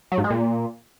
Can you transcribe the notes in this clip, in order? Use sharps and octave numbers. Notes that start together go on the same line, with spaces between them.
F#3
G#2
G#3
A#2